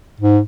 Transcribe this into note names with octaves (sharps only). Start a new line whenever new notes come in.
G#2